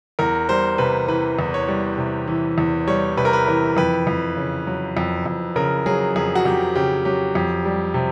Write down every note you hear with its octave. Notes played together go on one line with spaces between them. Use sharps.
E2 A#4
G3 C5
C3 B4
E3 B4
E2
C#5
G3
C3
E3
E2
G3 C#5
C3 B4
A#4
B4
E3 A#4
F2 B4
F2
C#3
F#3
F2
F2
C#3 A#4
F#3 G#4
F2 G#4
F#4
F2 G4
C#3 G4
F#3 G4
F2
G3
C3